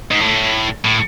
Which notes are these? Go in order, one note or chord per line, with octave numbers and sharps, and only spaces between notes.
G#2
A2
A2